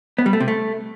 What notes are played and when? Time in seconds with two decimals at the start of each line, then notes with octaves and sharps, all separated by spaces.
0.19 B3
0.26 G3
0.33 A3
0.40 C3
0.48 A3